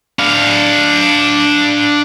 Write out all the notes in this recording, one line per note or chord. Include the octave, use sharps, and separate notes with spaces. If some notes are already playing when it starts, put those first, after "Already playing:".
D4 F5